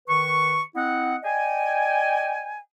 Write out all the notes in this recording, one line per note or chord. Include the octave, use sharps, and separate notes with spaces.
D#3 B4 C#6
C4 E4 D#5 F#5
D5 D#5 G5 G#5